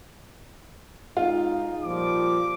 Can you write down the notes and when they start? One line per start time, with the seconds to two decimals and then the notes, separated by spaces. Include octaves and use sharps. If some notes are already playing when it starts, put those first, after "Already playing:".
1.17 G#3 D#4 F4
1.84 A#2 F3 G3 D6